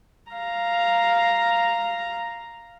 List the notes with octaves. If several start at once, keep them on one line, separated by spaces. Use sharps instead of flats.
F5 A#5